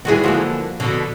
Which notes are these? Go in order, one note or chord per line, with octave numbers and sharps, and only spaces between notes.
D#3 E3 G3 G#3 F#4 G#4
D3 E3 F3 A#3 F#4 C5
B2 D3